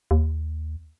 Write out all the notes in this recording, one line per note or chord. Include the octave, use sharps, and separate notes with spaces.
D#2